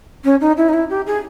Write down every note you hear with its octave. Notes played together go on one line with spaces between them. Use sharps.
C#4
D#4
E4
D#4
E4
G4
G#4